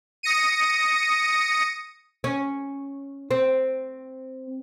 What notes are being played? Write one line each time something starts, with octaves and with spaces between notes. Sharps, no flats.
D#6 A#6 C#7 D#7
C#4
C4